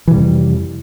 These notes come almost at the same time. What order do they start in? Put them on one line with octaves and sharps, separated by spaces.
E3 C3 G3 F2